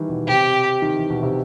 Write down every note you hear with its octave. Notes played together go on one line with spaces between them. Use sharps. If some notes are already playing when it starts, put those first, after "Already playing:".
Already playing: D#3 E3 G3
B2
C3 G4
D#3
E3
B2
C3